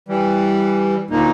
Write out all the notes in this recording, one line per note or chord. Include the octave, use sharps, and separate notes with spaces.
E3 G3
D2 A#2 A#3 D#4